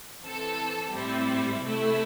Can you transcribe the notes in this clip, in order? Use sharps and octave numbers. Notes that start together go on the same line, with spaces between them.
E3 C4 A4
A2 G3 C4 E4
C3 A3 E4